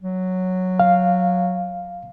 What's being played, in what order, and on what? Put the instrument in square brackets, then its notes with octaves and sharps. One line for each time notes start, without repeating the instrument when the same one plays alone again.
[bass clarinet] F#3
[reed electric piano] F5